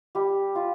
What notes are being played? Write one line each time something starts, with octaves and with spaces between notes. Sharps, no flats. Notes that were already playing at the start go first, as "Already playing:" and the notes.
G3 G4
F4